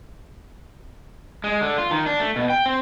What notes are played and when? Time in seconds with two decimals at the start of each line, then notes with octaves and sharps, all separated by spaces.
1.44 G#3
1.61 D3
1.78 F4
1.91 D#3
2.06 D4
2.20 A3
2.36 B2
2.50 G5
2.66 C4